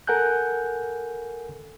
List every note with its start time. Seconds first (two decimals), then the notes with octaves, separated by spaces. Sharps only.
0.07 A4 A#4 F#5 G#5 F#6 G6